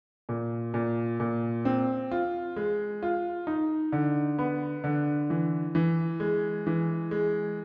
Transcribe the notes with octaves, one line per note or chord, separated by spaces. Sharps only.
A#2
A#2
A#2
C4
F4
G#3
F4
D#4
D3
B3
D3
E3
E3
G#3
E3
G#3